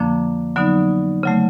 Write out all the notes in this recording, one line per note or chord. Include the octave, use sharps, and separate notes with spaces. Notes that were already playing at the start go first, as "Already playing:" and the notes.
Already playing: F2 D3 F3 A#3 D4
D3 F#3 B3 D#4
C#3 F#3 A3